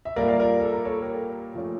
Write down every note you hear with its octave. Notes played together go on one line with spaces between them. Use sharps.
E5
A#2 G3 A#3 A#4 D5
D5 F5
A#4 D5
A4
A#4
A4 C#5
G4 A#4
A#2 F3 A3 C#4